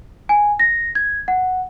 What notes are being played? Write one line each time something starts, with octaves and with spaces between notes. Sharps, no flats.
G#5
A#6
G#6
F#5